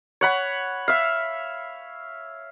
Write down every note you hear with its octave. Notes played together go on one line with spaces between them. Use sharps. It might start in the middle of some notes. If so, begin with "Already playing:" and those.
C#5 F#5 B5
E5 F5